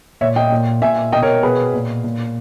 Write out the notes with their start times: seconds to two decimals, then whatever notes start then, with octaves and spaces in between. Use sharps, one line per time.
0.21 A#2 C#5 E5
0.36 D#5 G5
0.52 A#2
0.82 A#2 E5 G#5
1.12 B2 D#5 G5
1.22 A#4 C#5
1.43 B2 G#4 B4
1.74 A#2
2.04 A#2